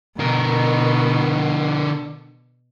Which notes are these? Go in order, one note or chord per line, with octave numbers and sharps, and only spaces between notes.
B2 D3 A#4